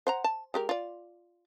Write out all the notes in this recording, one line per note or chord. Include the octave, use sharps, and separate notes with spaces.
C5 F#5 A#5
A5
G#3 G4 A#4
F4 D5